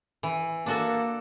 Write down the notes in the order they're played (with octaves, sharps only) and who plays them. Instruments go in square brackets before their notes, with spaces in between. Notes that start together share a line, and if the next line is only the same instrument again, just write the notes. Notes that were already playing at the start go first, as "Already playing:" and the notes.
[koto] E3
[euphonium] A#3 [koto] D4 F#4 A4